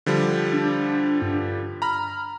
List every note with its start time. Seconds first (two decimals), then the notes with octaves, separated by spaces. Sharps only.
0.06 D3 F3 G3
0.53 D4
1.22 G2
1.82 A#5 B5 F6